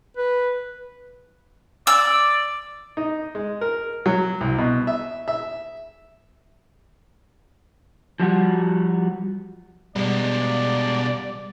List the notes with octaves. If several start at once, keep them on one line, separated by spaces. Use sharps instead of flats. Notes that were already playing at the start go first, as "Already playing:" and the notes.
B4
D5 E6
D#4
G#3
A#4
F#3
C2
B2
E5
E5
F3 G3 F#4
B2 G3 G#3 D5